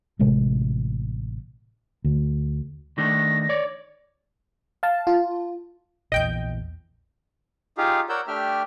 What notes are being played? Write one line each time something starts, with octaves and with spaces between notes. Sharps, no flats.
A1 C3 G#3
D2
D#3 A3 D4 A#6
C#5 D5
F5 A5
F4
A#1 E2 D#5 G5 G6
D#4 F4 G4 G#4 F5
A#4 C#5 D5 F#5 E6 G6
A3 D4 G4 E5 G5 F6